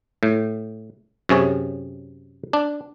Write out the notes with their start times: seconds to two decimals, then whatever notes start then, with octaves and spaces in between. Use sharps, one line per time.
0.23 A2
1.29 F#2 C3 G#4 C#5
2.53 D4